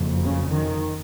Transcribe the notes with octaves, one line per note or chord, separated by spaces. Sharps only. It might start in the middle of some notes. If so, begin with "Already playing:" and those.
Already playing: F#1 F2
C#3
D#3